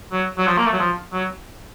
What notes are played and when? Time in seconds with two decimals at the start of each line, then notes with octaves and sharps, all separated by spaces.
0.12 F#3
0.38 F#3
0.47 F3
0.58 A#3
0.66 A3
0.73 F#3
0.79 F3
1.13 F#3